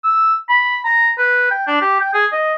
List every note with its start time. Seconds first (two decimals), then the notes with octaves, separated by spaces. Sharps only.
0.04 E6
0.49 B5
0.85 A#5
1.18 B4
1.51 G5
1.67 D4
1.81 G4
2.00 G5
2.14 G#4
2.32 D#5